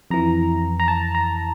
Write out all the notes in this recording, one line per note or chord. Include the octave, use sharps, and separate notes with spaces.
F2 E3 A#5
A#5
A5
A#5